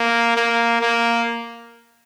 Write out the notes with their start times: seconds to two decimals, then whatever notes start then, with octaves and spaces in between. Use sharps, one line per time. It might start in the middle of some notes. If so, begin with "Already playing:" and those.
Already playing: A#3
0.37 A#3
0.81 A#3